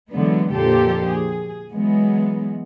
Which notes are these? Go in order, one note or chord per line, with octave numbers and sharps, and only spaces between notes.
D3 E3 F#3 G#3 B3
F2 A#2 D3 G4 A4 C5
G#4
E3 F#3 G#3 B3